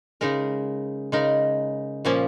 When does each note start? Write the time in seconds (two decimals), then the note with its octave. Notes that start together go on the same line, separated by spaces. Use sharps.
0.21 C#3 G#3 D#4 A#4
1.12 C#3 G#3 D#4 A#4
2.05 A#2 F3 A#3 C#4